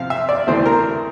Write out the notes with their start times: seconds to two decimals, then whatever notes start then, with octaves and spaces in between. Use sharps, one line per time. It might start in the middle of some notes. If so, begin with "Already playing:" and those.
Already playing: C3 F3 C4 F5
0.10 E5
0.29 D5
0.47 D2 C3 E3 A3 C4 C5
0.66 A#4